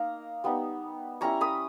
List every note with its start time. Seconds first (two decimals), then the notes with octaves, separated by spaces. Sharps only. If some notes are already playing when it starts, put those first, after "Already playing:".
Already playing: A#3 D#4 A#5
0.44 G3 B3 D#4
1.21 G3 C#4 E4 A#5 C#6
1.41 B5 D#6